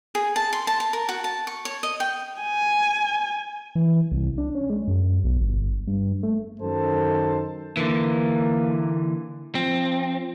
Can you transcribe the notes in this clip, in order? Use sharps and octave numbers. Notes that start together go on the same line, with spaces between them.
G#4
A5
C6
A5
A5
A#4
F#4
A5
C#6
C#5
D#5
G5
G#5
E3
C2
D4
C#4
G#3
F#2
B1
G1
G2
A3
F#2 D#3 A4 C5 A5
D3 E3 A#3
F3 C4